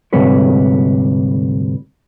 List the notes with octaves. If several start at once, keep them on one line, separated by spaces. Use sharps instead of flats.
D2 G#2 C3 G3 B4 C#5